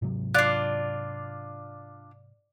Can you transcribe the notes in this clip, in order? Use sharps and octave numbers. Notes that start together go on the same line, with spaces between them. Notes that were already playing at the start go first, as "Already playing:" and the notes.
G#2 C3 F#3
D4 F4 D5 F#6